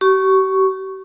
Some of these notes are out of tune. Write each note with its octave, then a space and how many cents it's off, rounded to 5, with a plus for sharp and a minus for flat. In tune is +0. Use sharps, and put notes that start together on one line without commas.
G4 -40 C#6 +0